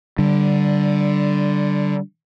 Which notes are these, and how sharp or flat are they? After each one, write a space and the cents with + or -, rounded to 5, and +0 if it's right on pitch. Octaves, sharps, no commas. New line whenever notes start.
D3 +0 G3 -20